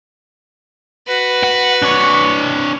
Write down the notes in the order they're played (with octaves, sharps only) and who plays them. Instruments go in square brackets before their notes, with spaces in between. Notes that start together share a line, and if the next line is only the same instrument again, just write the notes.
[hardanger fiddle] F#4 B4
[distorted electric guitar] F#5
D4 C#5